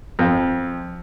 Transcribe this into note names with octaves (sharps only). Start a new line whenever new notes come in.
F2